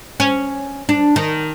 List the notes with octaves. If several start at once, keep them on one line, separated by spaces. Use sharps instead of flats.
C#4
D4
D#3